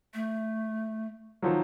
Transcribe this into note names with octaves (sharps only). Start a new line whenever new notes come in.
A3
D#3 F3 F#3